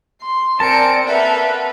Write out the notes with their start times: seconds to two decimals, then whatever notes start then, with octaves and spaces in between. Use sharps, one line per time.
0.22 C6
0.60 C4 A#4 D5 G#5 A5 C#7 D7
1.07 A#3 A4 B4 E5 F#5